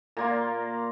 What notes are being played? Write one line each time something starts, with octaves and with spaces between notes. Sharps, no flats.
A#2 A#3 F4